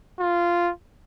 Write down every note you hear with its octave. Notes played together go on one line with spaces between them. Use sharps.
F4